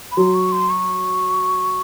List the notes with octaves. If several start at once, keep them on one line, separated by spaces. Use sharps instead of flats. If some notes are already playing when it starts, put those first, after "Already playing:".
B5
F#3 C6
C#6
C6
C#6